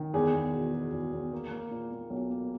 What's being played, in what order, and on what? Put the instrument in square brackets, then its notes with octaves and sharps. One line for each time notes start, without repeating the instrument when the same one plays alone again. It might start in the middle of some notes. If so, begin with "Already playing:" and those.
Already playing: [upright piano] D#3
E2 G#4
E2
B2
B2
E2
E2
A#3
A#3
A#2
A#3
B1
A#3